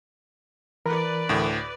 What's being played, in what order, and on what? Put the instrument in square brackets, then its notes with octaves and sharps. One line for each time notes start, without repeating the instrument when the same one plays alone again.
[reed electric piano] E3 A#4 B5 [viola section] B4 D5
[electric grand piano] D2 A2